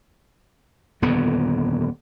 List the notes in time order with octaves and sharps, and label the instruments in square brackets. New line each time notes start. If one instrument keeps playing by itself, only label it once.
[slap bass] D#1 F2 D3 B3